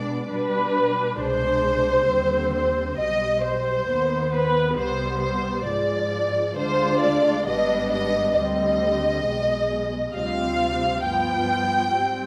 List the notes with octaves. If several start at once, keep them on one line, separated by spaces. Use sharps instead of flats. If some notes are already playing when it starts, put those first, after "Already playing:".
Already playing: B2 G#3 B3 D4 D5
B2 G3 D4 B4
C2 B2 G#3 D4 C5
D#2 D3 G3 C4
C5
B1 B2 G3 D#5
C5
D#2 D#3 B3
B4
C2 C3 G3 B3 C5
C5
G#2 F3 G#3 D5
D2 D3 G#3 D4 F4 C5
D5
G#1 G#2 G3 B3 D4 D#5
D#5
D2 D3 G3 C4 D#5
B1 B2 G#3
D2 C3 G3 C4 F4 F5
G2 F3 B3 F4 G5
G#2 G3 C4